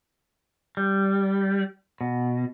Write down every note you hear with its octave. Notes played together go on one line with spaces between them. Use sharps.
G3
B2